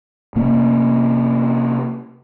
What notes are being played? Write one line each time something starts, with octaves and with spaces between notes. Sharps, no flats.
C3 A#3 C#4